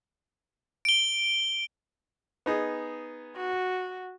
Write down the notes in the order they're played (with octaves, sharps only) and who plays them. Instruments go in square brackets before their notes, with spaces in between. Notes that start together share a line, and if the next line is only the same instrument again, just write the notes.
[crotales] D7 G7
[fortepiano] B3 D#4 G#4
[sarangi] F#4